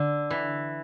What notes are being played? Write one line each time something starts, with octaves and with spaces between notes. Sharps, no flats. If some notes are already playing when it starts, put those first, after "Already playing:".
Already playing: D3
E3